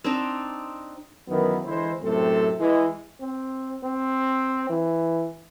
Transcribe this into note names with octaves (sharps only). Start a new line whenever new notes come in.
C4 D4 D#4
F#2 D#3 E3 B3
D3 E3 G#3 E4 C5
F#2 A2 C3 A3 C4 A4
E3 G#3
C4
C4
E3